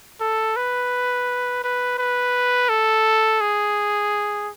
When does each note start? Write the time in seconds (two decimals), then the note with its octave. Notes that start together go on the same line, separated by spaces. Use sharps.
0.21 A4
0.57 B4
1.64 B4
1.98 B4
2.69 A4
3.41 G#4